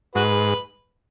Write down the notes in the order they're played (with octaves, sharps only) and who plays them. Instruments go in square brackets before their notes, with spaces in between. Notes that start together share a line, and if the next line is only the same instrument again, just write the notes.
[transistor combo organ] G#2 [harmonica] F#4 B4